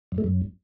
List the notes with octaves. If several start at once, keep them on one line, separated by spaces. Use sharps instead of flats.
F#2
A3
F#2